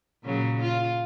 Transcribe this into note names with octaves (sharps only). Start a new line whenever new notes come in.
A#2 C#3 F#3
F4